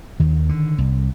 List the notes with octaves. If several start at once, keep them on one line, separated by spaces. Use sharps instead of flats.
D#2 D#3
D3
C2